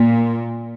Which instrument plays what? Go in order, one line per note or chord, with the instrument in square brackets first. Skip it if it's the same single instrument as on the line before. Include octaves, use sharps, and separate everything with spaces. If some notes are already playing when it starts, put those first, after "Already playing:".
Already playing: [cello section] A#2